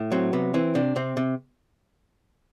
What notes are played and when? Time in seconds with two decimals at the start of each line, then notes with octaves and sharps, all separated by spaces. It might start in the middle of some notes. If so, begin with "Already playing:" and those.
Already playing: A2
0.12 F#3 C4
0.33 C3 B3
0.54 E3 C4
0.75 C3 D4
0.96 C3 C4
1.17 C3